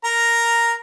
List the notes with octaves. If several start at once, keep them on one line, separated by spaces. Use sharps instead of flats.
A#4 A#5